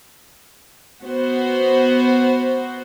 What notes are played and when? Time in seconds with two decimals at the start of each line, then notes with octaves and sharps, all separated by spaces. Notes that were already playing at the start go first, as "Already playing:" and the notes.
1.05 B3 F#4 C5